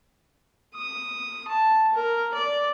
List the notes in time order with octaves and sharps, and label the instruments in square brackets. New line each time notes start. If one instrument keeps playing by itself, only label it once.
[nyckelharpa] D#6
A5
A#4
D5